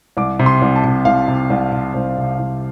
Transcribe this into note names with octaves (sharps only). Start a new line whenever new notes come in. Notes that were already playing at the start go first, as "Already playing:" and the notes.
C2 D6
C3
C6
C2
A5
C3
C2 F5
C3
C2
C3
C2 C5
C3
C2